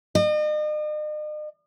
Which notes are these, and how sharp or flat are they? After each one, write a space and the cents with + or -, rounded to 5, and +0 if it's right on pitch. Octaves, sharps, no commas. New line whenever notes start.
D#5 -45